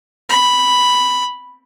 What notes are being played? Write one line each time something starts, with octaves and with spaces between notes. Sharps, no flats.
B5